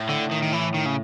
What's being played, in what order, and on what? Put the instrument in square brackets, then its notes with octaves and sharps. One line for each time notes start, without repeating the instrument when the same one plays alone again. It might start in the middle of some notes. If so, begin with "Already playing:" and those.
Already playing: [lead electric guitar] A2
[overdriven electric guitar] D3
D#3
D#3
E3
D#3
C#3